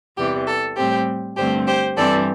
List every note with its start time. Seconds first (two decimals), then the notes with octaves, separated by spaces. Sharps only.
0.17 E2 C3 E3 G3 G4
0.47 A4
0.77 A2 G3 C4 G4 C5
1.37 G2 D3 A3 C4 G4 C5
1.67 G4 C5
1.97 G2 E3 C4 A4 D5